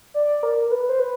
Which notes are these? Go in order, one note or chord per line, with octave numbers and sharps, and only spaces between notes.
D5
A#4
A#4
B4
C5
B4